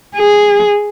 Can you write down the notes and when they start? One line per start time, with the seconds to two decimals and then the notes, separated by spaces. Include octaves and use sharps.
0.16 G#4